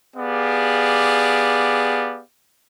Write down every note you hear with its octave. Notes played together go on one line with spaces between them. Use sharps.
B3 G4 G#4 D5 F5